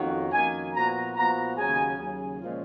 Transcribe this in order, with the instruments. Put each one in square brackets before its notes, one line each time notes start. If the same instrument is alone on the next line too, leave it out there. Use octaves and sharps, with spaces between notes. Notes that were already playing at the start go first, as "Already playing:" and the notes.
Already playing: [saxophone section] F2 D#3 A#3 C#4 F#4
[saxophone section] F2 D#3 A#3 C#4 F#4 [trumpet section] G#5
[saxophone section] A#2 F3 B3 F#4 [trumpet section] A#5
[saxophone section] A#2 F3 B3 F#4 [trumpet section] A#5
[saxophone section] D#2 C#3 F#3 C#4 G#4 [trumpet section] G#5
[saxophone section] D#2 C#3 F#3 C#4 G#4
A#2 F3 G#3 C#4 F4